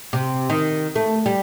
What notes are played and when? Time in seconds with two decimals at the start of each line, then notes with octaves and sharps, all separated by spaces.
0.13 C3
0.50 D#3
0.95 A3
1.26 G3